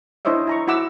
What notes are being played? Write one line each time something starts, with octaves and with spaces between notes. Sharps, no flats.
D4 E4 C5 C#5 D#5 E5
E4 A#5 C#6
E4 F#4 E5 F#5 D6 E6